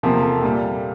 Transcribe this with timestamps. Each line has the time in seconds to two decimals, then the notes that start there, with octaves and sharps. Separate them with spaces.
0.03 E2 C3 F3 A#3
0.23 A4
0.42 A#2 G3